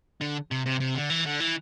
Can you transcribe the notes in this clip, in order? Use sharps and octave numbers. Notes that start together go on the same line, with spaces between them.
D3
C3
C3
C3
D3
E3
D3
E3